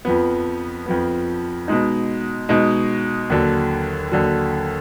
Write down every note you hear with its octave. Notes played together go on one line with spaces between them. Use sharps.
F2 F3 B3
F2 F3 B3
B2 G#3 D#4
B2 G#3 D#4
D#2 D3 F#3
D#2 D3 F#3